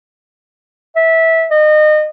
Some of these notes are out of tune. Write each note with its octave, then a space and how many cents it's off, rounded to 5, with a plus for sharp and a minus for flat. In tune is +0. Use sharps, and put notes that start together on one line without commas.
E5 -20
D#5 -30